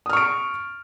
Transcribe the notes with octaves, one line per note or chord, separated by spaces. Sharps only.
C#6 D#6 F6 D7